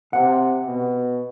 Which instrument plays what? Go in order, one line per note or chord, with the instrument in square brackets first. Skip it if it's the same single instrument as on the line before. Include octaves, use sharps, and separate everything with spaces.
[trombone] C3 [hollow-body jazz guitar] F#5
[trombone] B2